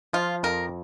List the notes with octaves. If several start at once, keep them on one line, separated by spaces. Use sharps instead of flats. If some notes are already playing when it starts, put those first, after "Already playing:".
F3 F4
F2 A#4